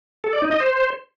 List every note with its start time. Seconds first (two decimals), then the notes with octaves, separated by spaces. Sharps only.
0.24 A4
0.33 D5
0.42 D#4
0.51 D#5
0.60 C5